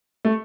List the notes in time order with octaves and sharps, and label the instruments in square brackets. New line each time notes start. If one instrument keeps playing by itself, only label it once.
[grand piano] A3